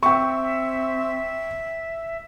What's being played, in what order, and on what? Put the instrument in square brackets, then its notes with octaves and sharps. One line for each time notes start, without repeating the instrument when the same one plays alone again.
[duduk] C4 [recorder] E5 [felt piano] G5 C#6